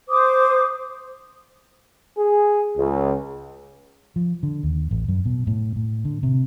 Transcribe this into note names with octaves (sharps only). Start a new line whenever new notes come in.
C5 D6 D#6
G#4
C#2
F3
D3
D#2
A1
F#2
B2
A2
A2
D3
C3